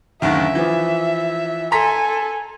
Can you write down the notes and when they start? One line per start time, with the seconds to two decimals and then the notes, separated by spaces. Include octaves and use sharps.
0.22 F#1 D2 D#3 E5
0.55 E3 F3
1.72 A4 G#5 A#5 C6 B6